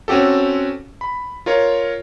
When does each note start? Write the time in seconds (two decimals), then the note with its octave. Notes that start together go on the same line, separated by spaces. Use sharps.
0.08 C4 C#4 F#4 G4 A4
1.01 B5
1.46 F4 A#4 C#5